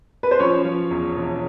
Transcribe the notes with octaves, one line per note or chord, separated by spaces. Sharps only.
B4
C5
F3 C#4 C#5
F3
E2
E1